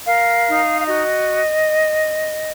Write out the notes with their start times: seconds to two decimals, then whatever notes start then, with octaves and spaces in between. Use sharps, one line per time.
0.05 A#4 F5
0.46 D#4
0.80 F5
0.86 F#4 D#5